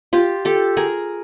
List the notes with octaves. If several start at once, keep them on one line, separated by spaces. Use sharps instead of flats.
F4 G4
G4 A4
G#4 A#4